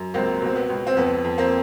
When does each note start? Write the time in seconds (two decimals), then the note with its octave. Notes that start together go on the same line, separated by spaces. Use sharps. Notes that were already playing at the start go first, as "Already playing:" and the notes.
Already playing: F#2
0.14 C#2 A#3 C4
0.42 B2 C4
0.56 B3
0.70 C#2
0.87 C4
0.97 F2 B3
1.24 F2
1.38 A#3 C4